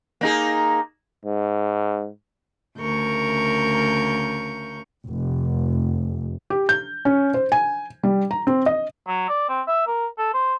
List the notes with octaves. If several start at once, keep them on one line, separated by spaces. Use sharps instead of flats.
A#3 D#4 G#4
G#2
D2 C#3 A#4 C#6 G6
F1
G4
G6
C#4
C5
G#5
G3
A#5
C4
D#5
F#3
D5
C4
E5
A#4
A4
C5